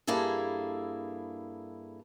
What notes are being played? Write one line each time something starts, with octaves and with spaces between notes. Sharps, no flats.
G2 A#3 E4 G#4 A4